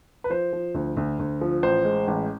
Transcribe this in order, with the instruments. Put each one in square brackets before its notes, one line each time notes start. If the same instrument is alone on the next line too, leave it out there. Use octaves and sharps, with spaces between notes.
[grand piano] B4
F3 C5
F3
D2
D2
D2
F3
A1 C5
G#3
A1